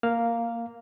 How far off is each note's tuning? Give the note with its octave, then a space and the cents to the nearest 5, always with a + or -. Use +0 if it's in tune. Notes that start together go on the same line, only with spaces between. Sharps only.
A#3 -5 F5 +0